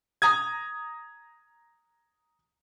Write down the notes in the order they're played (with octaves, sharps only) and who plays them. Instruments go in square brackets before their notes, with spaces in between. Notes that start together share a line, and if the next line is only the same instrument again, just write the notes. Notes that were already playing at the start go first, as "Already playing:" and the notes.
[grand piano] A#5 D#6 G#6